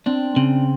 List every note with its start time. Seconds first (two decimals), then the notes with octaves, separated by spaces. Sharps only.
0.06 C4 D4
0.36 C#3 C4